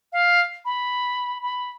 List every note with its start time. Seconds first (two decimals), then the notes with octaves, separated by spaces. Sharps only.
0.13 F5
0.65 B5
1.42 B5